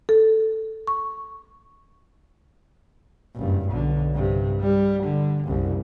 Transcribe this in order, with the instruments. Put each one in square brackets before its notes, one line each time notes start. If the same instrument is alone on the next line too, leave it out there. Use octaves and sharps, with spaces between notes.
[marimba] A4
C#6
[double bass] F#1 G2
B1 D3
G2 C3
G3
D3
F#1 C2